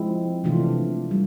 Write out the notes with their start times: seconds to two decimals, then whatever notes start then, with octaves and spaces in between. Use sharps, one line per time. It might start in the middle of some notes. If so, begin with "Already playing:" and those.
Already playing: F3 G#3 C4 E4
0.44 C3 E3 A3 D4 F4
1.11 G3